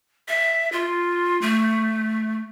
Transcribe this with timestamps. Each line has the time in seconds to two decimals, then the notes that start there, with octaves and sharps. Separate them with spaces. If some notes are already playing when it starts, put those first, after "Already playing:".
0.28 E5
0.72 F4
1.42 A3